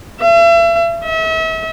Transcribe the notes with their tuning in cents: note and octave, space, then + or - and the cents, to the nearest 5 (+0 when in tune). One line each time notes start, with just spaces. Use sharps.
E5 +40
E5 -40